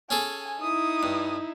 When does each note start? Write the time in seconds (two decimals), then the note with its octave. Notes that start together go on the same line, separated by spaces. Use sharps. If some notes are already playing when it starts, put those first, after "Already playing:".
0.10 C#4 G#4 A4 G#5
0.61 D#4 E4 D#6
1.03 G2